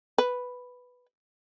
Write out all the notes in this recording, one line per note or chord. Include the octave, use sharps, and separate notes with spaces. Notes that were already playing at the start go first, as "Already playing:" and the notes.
B4